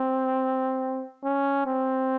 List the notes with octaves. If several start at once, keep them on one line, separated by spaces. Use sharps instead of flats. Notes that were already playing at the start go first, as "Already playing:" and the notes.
Already playing: C4
C#4
C4